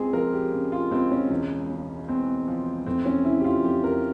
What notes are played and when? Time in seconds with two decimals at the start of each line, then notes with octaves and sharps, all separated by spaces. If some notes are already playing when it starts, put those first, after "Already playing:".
Already playing: C#2 C4 G#4
0.13 F3 A#4
0.33 G4
0.52 C#3
0.72 F4
0.91 C#2 C4
1.11 C#4
1.31 E1
1.69 C#3
2.09 E2 C4
2.48 F3
2.86 F1 C4
3.05 C#4
3.25 C#3 E4
3.40 G4
3.44 F4
3.64 F2 G4
3.84 A#4